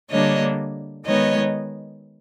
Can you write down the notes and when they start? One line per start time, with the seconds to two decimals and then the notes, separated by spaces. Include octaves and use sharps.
0.10 D3 G3 A#3 D4 C#5 D#5
1.05 D#3 G#3 B3 C#5 D#5